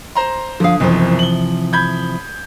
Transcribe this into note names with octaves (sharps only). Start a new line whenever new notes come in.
C5 A#5 C6
D3 F3 F5 D#6
F#1 B1 C3 E3 F3
F#7 G7
B5 G6 G#6